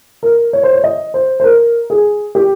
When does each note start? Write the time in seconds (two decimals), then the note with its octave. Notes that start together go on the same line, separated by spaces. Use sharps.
0.23 A#4
0.53 C#5
0.63 C5
0.73 C#5
0.84 D#5
1.14 C5
1.40 C5
1.44 A#4
1.90 G#4
2.35 G4